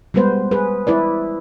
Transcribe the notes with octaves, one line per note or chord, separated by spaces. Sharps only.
G3 G#3 B3 B4 C5
G#4 B4
E4 B4 D5